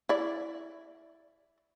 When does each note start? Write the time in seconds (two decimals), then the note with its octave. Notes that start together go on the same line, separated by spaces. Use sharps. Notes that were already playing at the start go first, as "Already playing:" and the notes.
0.09 E4 D5